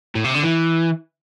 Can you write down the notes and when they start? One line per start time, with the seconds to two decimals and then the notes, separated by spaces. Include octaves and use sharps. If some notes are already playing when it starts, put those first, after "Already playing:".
0.15 A2
0.24 C3
0.34 D3
0.43 E3